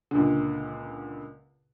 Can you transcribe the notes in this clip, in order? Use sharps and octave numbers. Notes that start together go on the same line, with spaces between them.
C#2 A#2 D3